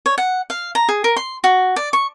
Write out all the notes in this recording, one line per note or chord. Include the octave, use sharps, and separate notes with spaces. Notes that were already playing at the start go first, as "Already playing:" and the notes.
C#5
F#5
F5
A#5
G#4
A#4
C6
F#4
D5
C#6